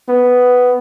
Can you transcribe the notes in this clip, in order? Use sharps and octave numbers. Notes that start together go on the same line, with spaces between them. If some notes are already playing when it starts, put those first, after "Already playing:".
B3